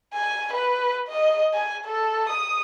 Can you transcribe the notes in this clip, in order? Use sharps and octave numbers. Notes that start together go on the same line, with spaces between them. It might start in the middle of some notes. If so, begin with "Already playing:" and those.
G#5
B4
D#5
G#5
A4
D#6